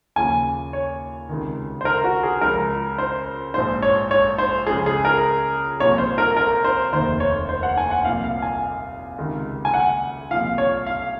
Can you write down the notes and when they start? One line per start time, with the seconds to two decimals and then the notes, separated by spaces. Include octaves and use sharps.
0.16 D#2 C#3 F3 G#5
0.73 C#5
1.29 C#2 C3 D#3
1.81 C5
1.85 A#4
2.04 F#4
2.23 G#4
2.41 C#2 C#3 F3 A#4
2.98 C5
3.54 A#1 G#2 F3 C5
3.82 C#5
4.11 C#5
4.38 C5
4.67 C#2 C#3 F3 G#4
4.86 G#4
5.05 A#4
5.79 C2 A#2 F3 C#5
5.98 C5
6.18 A#4
6.37 A#4
6.64 C5
6.92 F1 D#2 D#3 C5
7.20 C#5
7.49 C5
7.63 F#5
7.77 G#5
7.91 F#5
8.05 C2 A#2 F3 F5
8.24 F5
8.42 G#5
9.18 C#2 C3 D#3
9.65 G#5
9.74 F#5
10.31 C2 A#2 F3 F5
10.58 C#5
10.87 F5